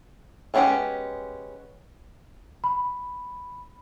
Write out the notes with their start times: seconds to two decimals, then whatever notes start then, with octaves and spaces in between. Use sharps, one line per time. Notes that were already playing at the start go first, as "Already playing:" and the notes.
0.54 G#3 B3 C#4 G4 F#5
2.64 B5